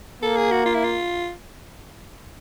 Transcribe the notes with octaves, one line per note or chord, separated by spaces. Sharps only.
A#3 A4
G#4
F#4
F4
E4
F4